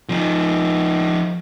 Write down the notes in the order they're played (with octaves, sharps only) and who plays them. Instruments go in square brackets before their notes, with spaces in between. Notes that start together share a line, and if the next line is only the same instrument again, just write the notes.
[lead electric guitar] F3 D#4